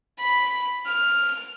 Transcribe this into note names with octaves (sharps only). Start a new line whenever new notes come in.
B5
F6